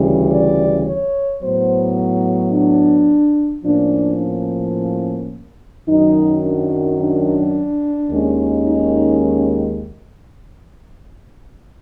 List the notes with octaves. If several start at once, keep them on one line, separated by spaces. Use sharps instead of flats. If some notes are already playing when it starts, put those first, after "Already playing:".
Already playing: D2 C#3 E3 G3
D5
C#5
A2 F#3 B3 C5
D4
A2 F3 A#3 C#4 D4
F#2 D#3 F#3 D#4
D4
D4
D#2 D#3 G#3 C#4
D#4